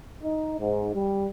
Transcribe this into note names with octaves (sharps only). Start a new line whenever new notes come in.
D#4
G#2
G3